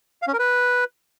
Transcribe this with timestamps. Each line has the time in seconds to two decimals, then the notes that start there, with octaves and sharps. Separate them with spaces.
0.22 F5
0.28 C#4
0.33 A#4
0.39 B4